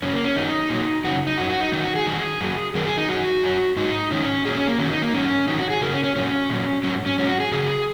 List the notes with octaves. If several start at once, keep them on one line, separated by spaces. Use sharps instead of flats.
F#2 C#3 F#3 C#4
A#3
C#4
F#2 D#3 F#3 D#4
A#2 F#3
F#2 C#3 F#3 F#4
D#4
F#2 F#3 F#4
F#4
D#4
F#2 D#3 F#3 D#4
F#4
G#4
F#2 D#3 F#3
F#2 F#3
F#2 D#3 F#3 A#4
G#4
D#4
F#2 D#3 F#3 F#4
F#2 F#3
G#2 F#3 D#4
G#2 D#3 F#3 C#4
A#2 F#3 G#4
C#4
A#3
F#2 D#3 F#3 C#4
D#4
A#3
G#2 F#3 C#4
G#2 D#3 F#3 D#4
F#4
G#4
F#2 C#3 F#3 A#4
C#4
C#4
A#2 F#3 C#4
A#2 F#3
G#2 F#3 C#4
C#4
G#2 F#3 C#4
F#4
G#4
F#2 C#3 F#3 G#4